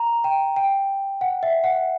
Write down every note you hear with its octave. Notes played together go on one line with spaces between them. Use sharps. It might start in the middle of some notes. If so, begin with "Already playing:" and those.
Already playing: A#5
G5
G5
F#5
E5
F#5